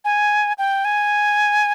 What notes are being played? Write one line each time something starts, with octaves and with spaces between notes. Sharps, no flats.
G#5
G5
G#5